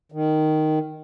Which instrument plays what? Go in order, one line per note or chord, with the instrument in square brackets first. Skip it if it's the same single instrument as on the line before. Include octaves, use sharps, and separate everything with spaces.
[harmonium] D#3